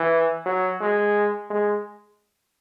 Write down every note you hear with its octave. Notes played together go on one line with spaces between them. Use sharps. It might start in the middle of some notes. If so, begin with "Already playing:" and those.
Already playing: E3
F#3
G#3
G#3